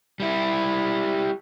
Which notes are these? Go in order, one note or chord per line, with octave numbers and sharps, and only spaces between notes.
G3 E4